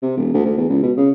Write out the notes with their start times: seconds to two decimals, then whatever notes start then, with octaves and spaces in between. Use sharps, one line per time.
0.02 C3
0.17 E1
0.34 D2
0.46 D2
0.58 E2
0.69 C#2
0.83 B2
0.97 C#3